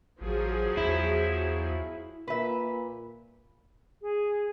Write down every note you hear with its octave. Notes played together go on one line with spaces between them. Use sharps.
A1 F3 F#3 G#4
E2 E4
A#2 B4 E5
G#4